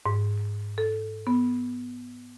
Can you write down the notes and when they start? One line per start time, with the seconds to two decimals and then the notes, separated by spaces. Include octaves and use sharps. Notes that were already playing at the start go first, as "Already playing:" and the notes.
0.06 G#2
0.78 A4
1.27 B3